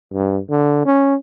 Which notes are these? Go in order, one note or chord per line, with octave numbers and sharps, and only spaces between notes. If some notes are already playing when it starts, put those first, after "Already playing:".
G2
D3
C#4